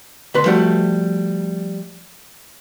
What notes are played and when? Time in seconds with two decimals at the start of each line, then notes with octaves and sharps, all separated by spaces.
0.34 D2 B4 C6
0.46 F3 G3 A3 F#4